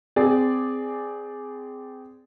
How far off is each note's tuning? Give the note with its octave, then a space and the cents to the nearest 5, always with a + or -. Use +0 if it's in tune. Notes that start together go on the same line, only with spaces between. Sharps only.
C4 -20 G#4 +0 D5 +0